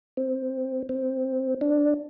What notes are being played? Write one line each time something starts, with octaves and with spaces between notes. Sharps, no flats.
C4
C4
D4